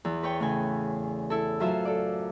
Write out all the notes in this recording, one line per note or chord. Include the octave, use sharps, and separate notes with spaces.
E2
B4 C#5 G5
A2 C#3 G5 G#5
E4 A4
F#2 F4 C5 E5 F5 C6
A4 D5